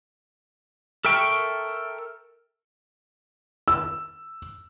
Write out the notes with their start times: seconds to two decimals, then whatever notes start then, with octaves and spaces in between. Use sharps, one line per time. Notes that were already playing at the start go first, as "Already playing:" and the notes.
1.05 A4 A#4 E5 G5 C#6
3.68 E6